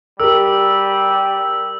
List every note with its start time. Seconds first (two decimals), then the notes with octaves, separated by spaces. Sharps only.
0.20 G3 G4 A#4 E6